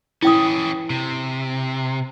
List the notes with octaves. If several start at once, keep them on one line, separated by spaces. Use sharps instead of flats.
E3 C#4 E4 G5 D#6
C3